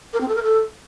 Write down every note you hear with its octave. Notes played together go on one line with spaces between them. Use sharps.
A#4
C4
A4
A#4
A4